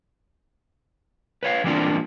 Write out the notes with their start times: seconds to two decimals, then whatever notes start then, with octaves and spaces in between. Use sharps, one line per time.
1.43 B4 C#5 F5
1.64 E3 G3 A#3 C4 D4 F4